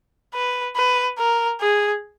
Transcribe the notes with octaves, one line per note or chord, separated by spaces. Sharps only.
B4
B4
A#4
G#4